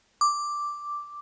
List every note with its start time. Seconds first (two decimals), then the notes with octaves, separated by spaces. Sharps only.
0.21 D6